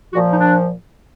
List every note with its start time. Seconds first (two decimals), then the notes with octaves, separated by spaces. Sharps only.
0.12 A#2 F3 F#4
0.31 D#4
0.40 D4